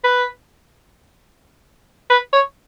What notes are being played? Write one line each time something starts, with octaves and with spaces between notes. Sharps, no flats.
B4
B4
C#5